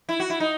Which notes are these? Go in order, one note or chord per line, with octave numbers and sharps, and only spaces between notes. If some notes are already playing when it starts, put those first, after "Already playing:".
E4
F#4
E4
D#4